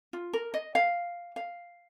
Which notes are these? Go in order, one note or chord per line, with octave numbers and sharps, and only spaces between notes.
F4
A#4
D#5
F5
F5